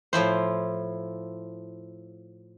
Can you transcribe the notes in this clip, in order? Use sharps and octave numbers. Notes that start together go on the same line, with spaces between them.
A2 F3 E4 C5